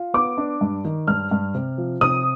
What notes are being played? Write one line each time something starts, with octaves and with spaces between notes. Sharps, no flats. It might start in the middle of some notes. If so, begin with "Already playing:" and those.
Already playing: F4
B3 D6
D4
G2
D#3
G2 F6
G2
C3
F3
C3 D#6